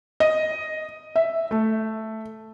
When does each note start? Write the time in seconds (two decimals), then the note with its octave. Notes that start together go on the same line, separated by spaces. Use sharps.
0.20 D#5
1.16 E5
1.51 A3